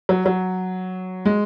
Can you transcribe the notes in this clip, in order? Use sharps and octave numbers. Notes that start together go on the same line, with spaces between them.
F#3
F#3
G#3